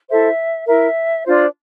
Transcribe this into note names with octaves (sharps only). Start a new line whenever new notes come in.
E4 A4 C5 E5
E4 A#4 E5
D4 F4 C5